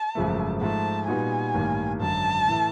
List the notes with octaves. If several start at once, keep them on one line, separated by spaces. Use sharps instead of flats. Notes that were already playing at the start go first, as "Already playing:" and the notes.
Already playing: A5
G#1 F#2 C#3 F3 A3
G#2 F3 A3 A5
A#2 G3 B3 D#4 F#4 G#5
A1 G2 D#3 G3 A#3
G#1 F#2 D3 A5
A2 E3 A3